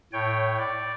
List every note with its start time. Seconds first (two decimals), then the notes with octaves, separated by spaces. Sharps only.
0.13 A2 C#5 G5
0.59 D5